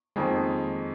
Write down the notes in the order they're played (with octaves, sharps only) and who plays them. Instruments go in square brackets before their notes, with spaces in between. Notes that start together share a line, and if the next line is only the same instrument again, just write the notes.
[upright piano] F2 D#3 A#3 [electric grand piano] G#3